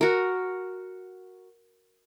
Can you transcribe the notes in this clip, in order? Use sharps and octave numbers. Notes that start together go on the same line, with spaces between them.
F#4 A#4